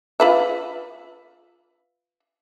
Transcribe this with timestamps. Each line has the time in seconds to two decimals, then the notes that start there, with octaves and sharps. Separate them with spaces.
0.20 F4 B4 E5